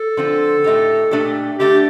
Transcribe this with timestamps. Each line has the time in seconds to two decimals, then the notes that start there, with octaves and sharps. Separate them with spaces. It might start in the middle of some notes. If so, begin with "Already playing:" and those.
Already playing: A4
0.17 D3 F3 C4 F4
0.64 A2 A3 D#4 G4
1.11 A#2 A3 D4 G4
1.59 D3 A3 D4 G4